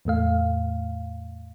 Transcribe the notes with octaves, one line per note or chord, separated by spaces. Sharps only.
E2 A2 A3 F5